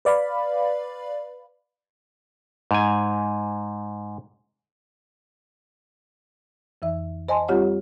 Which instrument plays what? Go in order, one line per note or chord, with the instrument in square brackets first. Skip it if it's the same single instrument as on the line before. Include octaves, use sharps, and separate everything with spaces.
[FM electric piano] B4 D5 F5 B5
[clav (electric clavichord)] G#2 G#5
[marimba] F2 E3 E5
C5 D#5 G#5 A5 C6
G3 C4 F4 G4 C#5 F#5